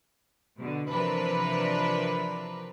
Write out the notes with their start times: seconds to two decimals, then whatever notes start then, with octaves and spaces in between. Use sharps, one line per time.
0.59 B2 D3
0.90 C3 E3 F3 D4 A#4 B4